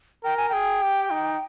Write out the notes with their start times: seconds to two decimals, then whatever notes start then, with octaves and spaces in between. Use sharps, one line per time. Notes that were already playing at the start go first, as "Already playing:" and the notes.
0.24 A#4 G5
0.37 G#5
0.49 G#4 G5
0.82 G4
1.11 D#4